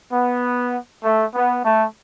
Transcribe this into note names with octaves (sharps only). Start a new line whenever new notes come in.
B3
A3
B3
A3